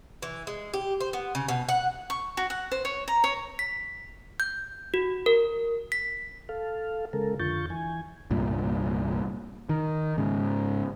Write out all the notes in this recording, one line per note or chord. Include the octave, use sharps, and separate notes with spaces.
E3
G#3
G4
C5
B3
C#3
B2
F#5
C#6
F#4
F#5
C5
C#5
A#5
C#5
B6
G6
F#4
A#4
B6
A4 F5
C#3 G#3 A4 A#4
F2 D3 F4 C#6 G6 A6
E3 G#5
C2 G2 A#2
D#3
G#2 C#3